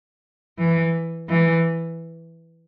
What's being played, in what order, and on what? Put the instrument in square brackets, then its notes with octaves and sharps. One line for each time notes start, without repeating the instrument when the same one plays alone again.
[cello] E3
E3